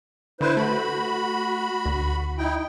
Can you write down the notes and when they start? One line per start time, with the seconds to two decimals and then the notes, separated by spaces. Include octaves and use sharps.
0.41 D3 E4 B4 C5
0.57 A3 F#4 B5
1.86 D2
2.38 D#4 E4 G5